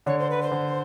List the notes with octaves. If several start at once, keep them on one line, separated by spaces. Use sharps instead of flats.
D3 C#5
C5
B4
C5
D3